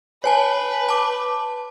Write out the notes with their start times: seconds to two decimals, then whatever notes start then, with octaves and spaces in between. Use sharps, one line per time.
0.24 B4 C#5 G#5 A5
0.89 A5 D6